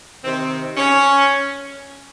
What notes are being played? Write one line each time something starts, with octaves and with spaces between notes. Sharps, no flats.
C3 D#3 C4
C#4